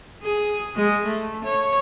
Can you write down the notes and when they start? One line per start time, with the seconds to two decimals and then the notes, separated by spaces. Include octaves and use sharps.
0.23 G#4
0.76 G#3
1.05 A3
1.45 C#5